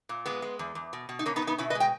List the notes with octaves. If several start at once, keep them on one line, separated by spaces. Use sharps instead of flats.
A#2
G#3 B3
G#3
E2
E2
B2
B2
D#4
B2 A#3 C#4
B3 D#4
B2
B3 D#4
B2 C#4 E4
B4 D#5
G#3
D#5 G5